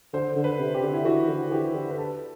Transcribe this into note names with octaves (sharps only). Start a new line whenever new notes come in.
D3 C5
D3
B4
C3
G4
D3
E4
E3 F#4
D3
E3 G4
D3
B4
A4